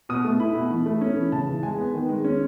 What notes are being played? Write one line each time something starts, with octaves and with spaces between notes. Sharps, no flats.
B2 D#6
A3
E4 B5
B2
E3
A3
C#4
E3
C#3 A5
E3
G#3 G#5
B3
D#3
G#3
C#4